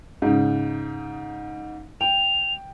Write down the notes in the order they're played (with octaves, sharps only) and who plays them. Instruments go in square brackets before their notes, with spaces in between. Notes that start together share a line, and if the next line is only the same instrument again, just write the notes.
[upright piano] G#2 C#3
[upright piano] G5 [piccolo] F7